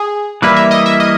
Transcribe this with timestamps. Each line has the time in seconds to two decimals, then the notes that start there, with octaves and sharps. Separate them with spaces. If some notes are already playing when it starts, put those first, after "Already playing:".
Already playing: G#4
0.42 E3 G3 A#3 E4 B4
0.57 E5
0.71 D#5
0.86 E5
1.00 D#5